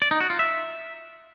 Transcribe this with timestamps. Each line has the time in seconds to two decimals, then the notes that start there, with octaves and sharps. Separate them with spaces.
0.02 D5
0.11 D#4
0.20 F#4
0.30 F4
0.39 E5